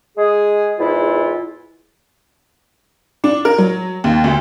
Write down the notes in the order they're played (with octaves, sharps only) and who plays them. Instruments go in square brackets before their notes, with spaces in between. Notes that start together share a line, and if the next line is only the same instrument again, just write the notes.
[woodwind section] G#3 G#4
E2 G#2 E4 F4
[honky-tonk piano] D4
A#4
F#3
D#2
D2